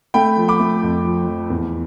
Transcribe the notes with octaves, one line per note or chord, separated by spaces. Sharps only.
A3 G5 B5
F3
B5 D6
A3
F2
F3
F3
E2